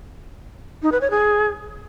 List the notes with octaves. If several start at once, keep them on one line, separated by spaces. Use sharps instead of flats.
D#4
B4
C#5
G#4